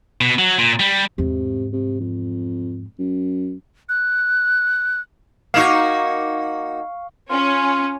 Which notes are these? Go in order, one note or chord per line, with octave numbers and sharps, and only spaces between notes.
B2
F#3
A#2
G3
E2 G#2 C3
C3
F2
F#2
F#6
A#3 D#4 F#4 F5 C#6
C#4 F4